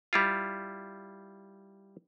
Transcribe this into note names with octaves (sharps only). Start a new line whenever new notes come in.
G3 E4 F4